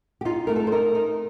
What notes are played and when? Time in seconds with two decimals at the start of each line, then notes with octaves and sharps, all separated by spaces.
0.21 G4
0.25 D#4 F4
0.47 A3 A#4
0.56 A4
0.67 C5
0.72 D#4 A#4
0.95 D#4